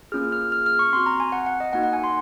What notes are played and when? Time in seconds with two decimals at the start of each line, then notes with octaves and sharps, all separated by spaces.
0.12 A#3 C#4 F4 G#4 F6
0.32 F6
0.52 F6
0.66 F6
0.79 C#6
0.93 C4 F#4 C6
1.06 A#5
1.20 G#5
1.32 F#5
1.46 F#5
1.60 D#5
1.73 A#3 D#4 F#4 F#5
1.83 F#5
1.93 G#5
2.04 C6